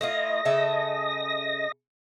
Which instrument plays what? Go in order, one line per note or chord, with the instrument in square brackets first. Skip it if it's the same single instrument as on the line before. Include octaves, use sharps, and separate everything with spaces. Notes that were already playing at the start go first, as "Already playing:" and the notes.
[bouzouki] A3 E4 F4 [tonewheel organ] D#5 A#6
[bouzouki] C#3 A4 E5